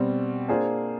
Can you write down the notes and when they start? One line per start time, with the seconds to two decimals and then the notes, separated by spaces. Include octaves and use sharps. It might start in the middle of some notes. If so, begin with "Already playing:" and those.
Already playing: B2 G3 C4
0.48 A#3 D4 F4 G#4 C5